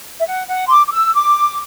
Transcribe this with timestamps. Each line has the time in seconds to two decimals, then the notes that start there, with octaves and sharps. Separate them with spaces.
0.19 E5
0.27 F#5
0.48 F#5
0.67 C6
0.70 D6
0.87 D6
0.92 E6
1.14 D6